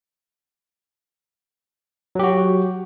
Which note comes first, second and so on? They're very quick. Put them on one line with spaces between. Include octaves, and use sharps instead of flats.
F#3 G4 F#4